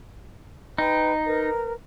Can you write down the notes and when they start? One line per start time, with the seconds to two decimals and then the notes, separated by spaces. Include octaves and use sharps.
0.78 D#4 B4 G5 B5
1.26 A#4 B4